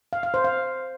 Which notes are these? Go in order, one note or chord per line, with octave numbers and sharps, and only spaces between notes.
F5
F5
C5
F5